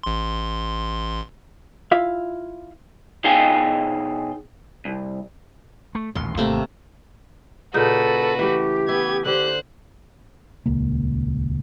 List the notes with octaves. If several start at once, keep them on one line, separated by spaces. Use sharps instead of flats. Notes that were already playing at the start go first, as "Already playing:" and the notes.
A1 C6
E4 F4 E5 F5
B2 D#4 G#4 F5 G5 G#5
C2
A3
D#1 A1 D#2 C6
G#1 C3 A3 A#3
A#2 C#3 D#4 F#4 A4 B4
E3 A3 G4
B3 E4 G#6
D3 G4 C5 F#6
D#1 C#2 A#3